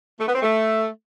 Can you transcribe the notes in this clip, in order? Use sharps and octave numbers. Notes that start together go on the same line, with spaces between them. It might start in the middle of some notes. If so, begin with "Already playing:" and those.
A3
B3
C4
A3